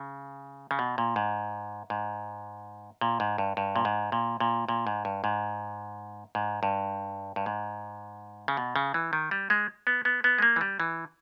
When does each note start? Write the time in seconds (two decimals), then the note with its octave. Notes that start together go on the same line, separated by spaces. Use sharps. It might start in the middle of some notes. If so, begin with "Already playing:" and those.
Already playing: C#3
0.71 C#3
0.79 B2
0.98 A#2
1.16 G#2
1.90 G#2
3.01 A#2
3.20 G#2
3.38 G2
3.57 G2
3.76 A#2
3.85 G#2
4.12 A#2
4.40 A#2
4.69 A#2
4.87 G#2
5.05 G2
5.24 G#2
6.35 G#2
6.63 G2
7.36 G2
7.46 G#2
8.48 C#3
8.57 B2
8.76 C#3
8.94 E3
9.13 D#3
9.31 G3
9.50 G#3
9.87 B3
10.05 B3
10.24 B3
10.38 G#3
10.42 A#3
10.56 E3
10.61 G3
10.80 E3